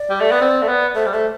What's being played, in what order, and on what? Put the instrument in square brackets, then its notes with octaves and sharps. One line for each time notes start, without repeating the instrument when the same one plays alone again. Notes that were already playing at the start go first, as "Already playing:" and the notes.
Already playing: [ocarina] D5
[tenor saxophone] G3
A3
B3
C4
A3
B3
[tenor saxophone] A3 [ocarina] C5
[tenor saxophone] G3
[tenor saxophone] A3 [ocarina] C5